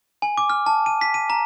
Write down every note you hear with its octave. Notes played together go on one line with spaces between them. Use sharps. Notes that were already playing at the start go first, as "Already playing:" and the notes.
G#5
D6
F6
A5
D#7
B6
D#7
A#5